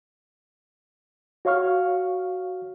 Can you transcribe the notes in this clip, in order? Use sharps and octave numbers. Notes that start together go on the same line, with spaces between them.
F#4 C#5 F5 C#6 F6